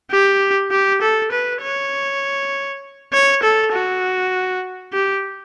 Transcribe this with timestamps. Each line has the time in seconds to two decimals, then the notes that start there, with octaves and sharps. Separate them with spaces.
0.11 G4
0.71 G4
1.02 A4
1.32 B4
1.62 C#5
3.13 C#5
3.43 A4
3.73 F#4
4.93 G4